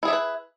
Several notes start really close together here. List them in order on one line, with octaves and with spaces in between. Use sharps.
E4 G#4 E5 D5 B4